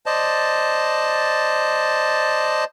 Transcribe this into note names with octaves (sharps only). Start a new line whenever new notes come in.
C5 D5 D#5 A5